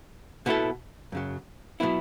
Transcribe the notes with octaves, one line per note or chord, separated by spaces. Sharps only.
B2 B3 E4 A4
F#2 C#3 F#3
B2 F#3 B3 E4